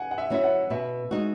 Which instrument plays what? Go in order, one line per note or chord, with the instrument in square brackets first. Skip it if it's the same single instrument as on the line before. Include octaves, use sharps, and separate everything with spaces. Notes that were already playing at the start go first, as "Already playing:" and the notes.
Already playing: [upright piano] F#5 G#5
F#5
E5
[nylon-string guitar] F#3 C#4 E4 [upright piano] E5
[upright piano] F#5
[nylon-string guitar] B2 [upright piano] E5
[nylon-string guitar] G#3 D#4 F#4